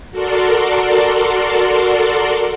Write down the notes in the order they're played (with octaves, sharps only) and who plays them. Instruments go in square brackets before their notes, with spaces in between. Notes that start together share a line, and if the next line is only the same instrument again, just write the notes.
[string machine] F#4 A4 A#4 D5 C6